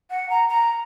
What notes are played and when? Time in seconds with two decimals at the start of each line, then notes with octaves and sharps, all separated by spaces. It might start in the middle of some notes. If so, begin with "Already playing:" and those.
0.10 F#5
0.30 A#5
0.49 A#5